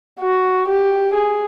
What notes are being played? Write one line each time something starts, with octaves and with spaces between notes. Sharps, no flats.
F#4
G4
G#4